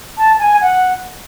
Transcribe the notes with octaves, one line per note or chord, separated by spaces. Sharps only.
A5
G#5
F#5